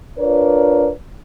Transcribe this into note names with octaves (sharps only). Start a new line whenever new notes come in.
D4 F4 A#4 B4 C#5 D5